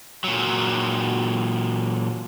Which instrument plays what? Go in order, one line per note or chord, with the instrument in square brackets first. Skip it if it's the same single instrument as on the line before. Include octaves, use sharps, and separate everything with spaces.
[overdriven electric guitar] A#2 F#3